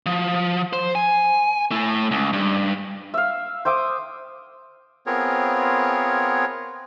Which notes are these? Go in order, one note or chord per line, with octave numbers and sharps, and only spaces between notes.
F3
C5
G#5
A3 E4
C#2
G2
E5 F5
C5 E5 D6 D#6
B3 C4 F4 G#4 A#4 C#5